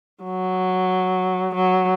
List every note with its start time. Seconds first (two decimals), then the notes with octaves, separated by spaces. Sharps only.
0.23 F#3
1.55 F#3